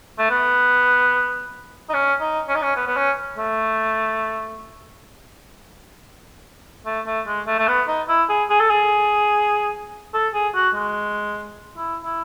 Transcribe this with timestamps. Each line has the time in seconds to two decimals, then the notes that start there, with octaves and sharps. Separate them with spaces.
0.18 A3
0.30 B3
1.89 D#4
1.94 C#4
2.20 D#4
2.48 C#4
2.55 D#4
2.62 C#4
2.76 B3
2.87 B3
2.96 C#4
3.38 A3
6.86 A3
7.06 A3
7.27 G#3
7.47 A3
7.58 A3
7.68 B3
7.88 D#4
8.08 E4
8.29 G#4
8.50 G#4
8.60 A4
8.70 G#4
10.13 A4
10.34 G#4
10.54 F#4
10.75 G#3
11.77 E4
12.04 E4